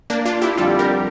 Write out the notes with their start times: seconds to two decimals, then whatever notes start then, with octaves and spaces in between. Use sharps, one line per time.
0.10 A#3 D4
0.25 D4 F4
0.42 E4 G4
0.57 F2 D3 G3 F4 A4
0.79 G4 A#4